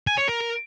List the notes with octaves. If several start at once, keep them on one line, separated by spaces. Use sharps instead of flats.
G#5
C#5
A#4